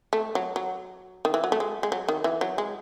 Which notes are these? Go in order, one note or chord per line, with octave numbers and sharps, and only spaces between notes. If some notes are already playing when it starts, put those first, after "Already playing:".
A3
F#3
F#3
D#3
E3
F#3
A3
G#3
G#3
F#3
D#3
E3
F#3
G#3